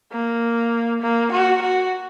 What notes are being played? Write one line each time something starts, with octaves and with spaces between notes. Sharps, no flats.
A#3
A#3
F#4
F#4